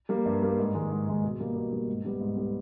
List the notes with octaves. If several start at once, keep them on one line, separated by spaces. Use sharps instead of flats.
G3 A#3
G2
G3 A#3
G#2
D#3 G#3
G#2
D#3 G#3
B2
G3 A#3
B2
G3 A#3
G#2
G3 B3
G#2
G3 B3